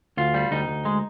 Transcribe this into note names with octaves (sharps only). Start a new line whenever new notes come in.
D2 F4
G3
D2 D#4
D2
G#3